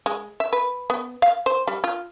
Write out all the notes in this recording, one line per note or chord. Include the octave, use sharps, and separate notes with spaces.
G#3
E5
B4
B3
F5
C5
G3
F4